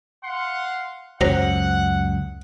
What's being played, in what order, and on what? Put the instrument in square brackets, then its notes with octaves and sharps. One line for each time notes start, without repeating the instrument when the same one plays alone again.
[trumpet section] F5 F#5 C6
[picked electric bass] C#2 F#2 [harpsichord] F#3 C5 A#5 [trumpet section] F#5